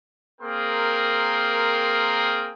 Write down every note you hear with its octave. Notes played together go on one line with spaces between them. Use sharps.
A#3 C4 G#4 A#4 G5 C6